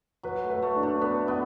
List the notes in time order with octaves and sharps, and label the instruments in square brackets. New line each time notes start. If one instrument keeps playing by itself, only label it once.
[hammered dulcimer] F#3 [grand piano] B4
[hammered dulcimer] A3
[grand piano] B4
[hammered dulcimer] A3
[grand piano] D4
[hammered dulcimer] A3
[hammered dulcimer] B3 [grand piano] B4
[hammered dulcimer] B3 [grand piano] D5